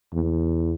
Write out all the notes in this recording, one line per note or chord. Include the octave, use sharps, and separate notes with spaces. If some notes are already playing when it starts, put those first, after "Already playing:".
E2